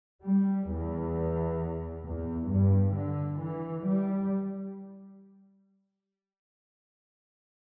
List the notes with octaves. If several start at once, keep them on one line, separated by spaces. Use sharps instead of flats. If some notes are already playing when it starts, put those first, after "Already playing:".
G3
E2
E2
G2
D3
E3
G3